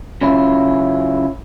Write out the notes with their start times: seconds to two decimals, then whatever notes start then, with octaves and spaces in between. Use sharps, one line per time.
0.21 C#3 F#3 C#4 E4 F4